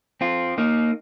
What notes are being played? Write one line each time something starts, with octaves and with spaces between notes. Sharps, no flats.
C4 F4
A#3 D#4